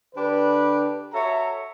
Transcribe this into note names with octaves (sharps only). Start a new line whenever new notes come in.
D3 D4 G4 B4
F#4 A4 C#5 E5 A#5